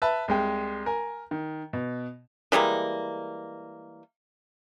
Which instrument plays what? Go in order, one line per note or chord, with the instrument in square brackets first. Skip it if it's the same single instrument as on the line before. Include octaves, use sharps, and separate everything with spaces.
[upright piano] B4 E5 A5
C2 G#3 G5
A#4 G#5
D#3
B2
[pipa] E3 G3 G#3 A#3